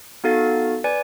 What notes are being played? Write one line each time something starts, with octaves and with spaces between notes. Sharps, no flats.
B3 D#4 F#4 A4 F5 A6
B4 D5 G#5